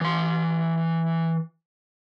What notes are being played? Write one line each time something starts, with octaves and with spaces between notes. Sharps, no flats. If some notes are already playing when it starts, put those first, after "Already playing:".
E3 C6